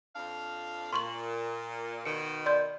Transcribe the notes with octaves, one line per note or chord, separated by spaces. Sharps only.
F2 D4 F5
A#2 C6 C#6 F#7
B2 D#3 C#7
D5 C6 G6